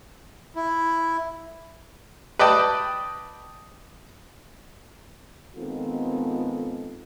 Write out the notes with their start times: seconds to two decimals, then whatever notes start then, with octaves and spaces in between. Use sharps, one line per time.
0.56 E4
2.39 B4 D5 D#5 G5 A5
5.56 D#3 G#3 B3 C4 F4 A4